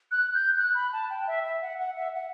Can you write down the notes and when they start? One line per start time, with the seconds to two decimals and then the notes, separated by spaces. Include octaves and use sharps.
0.11 F#6
0.34 G6
0.57 F#6
0.75 B5
0.93 A5
1.10 G5
1.27 E5
1.45 E5
1.62 F#5
1.79 F#5
1.96 E5
2.14 F#5